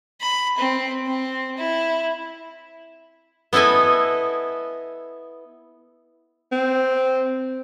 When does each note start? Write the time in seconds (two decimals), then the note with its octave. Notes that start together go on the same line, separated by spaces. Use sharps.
0.21 B5
0.58 C4
1.06 C4
1.57 E4
3.53 B3 E4 A4 D#5 G#5
6.52 C4